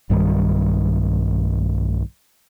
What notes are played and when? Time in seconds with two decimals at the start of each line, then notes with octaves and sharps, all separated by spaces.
0.10 B1 G2 D#3 G3